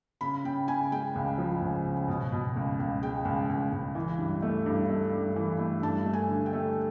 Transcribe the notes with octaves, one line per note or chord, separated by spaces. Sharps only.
C#3 B5
C#3 G5
C#3 G#5
G#3 G5
C#2
F3
C#2
C#3
B2
B2
C#2
C#2
G#3 G5
C#2
C#2
C#2
E3
G2
A3
G2
A3
G2
E3
A3
G2 A5
A3
G#5
D3
G5
A3